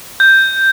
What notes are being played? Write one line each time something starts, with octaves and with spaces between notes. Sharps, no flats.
G6